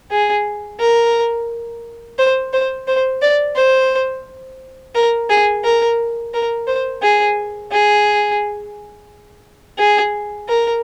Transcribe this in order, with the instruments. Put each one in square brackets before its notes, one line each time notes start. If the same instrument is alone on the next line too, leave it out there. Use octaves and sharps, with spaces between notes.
[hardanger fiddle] G#4
A#4
C5
C5
C5
D5
C5
A#4
G#4
A#4
A#4
C5
G#4
G#4
G#4
A#4